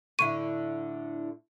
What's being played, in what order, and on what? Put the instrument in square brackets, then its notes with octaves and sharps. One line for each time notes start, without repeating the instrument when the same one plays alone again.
[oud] A2 D3 E4 [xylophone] C#6 D#7